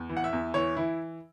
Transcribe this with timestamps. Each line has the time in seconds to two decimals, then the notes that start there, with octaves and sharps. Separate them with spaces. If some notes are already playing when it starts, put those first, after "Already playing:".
Already playing: E2
0.10 E3
0.17 F#5
0.24 E5
0.33 E2
0.54 E3 C#5
0.77 E3 E4